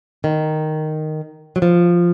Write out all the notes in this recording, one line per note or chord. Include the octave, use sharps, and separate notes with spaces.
D#3
F#3
F3